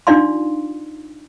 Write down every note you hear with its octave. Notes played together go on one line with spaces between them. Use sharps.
D4 D#4 F4 D5 F5 C6